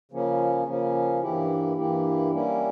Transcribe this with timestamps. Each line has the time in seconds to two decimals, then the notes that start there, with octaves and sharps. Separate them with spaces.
0.12 C#3 F3 A#3 C#4
0.67 C#3 F3 A#3 C#4
1.22 G2 E3 A#3 E4 G4
1.76 G2 E3 A#3 E4 G4
2.32 G3 A#3 C#4 E4